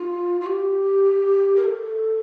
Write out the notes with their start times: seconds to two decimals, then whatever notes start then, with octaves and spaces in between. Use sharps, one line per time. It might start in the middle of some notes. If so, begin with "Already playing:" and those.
Already playing: F4
0.41 F4
0.46 G4
1.56 A#4
1.64 A4